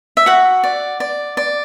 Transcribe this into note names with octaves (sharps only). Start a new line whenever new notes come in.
E5
F#4 F#5
D5
D5
D5